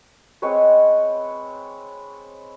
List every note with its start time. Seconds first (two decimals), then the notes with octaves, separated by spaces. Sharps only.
0.42 G#3 C4 B4 C#5